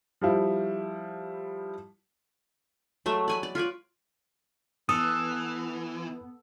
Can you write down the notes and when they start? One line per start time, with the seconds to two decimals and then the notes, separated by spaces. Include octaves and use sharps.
0.21 F3 G3 E4
3.06 F#3 G#3 A3 E5
3.28 D5 G#5 B5
3.43 D5
3.55 F4 B4 C#5 D5
4.89 E3 B3 A4 D#6